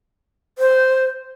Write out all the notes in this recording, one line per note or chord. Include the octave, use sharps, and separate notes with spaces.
C5